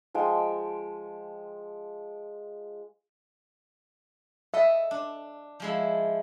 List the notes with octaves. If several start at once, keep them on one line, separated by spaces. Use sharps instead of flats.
F3 G#3 G5
A4 D#5 E5
D4
F3 G#3 E4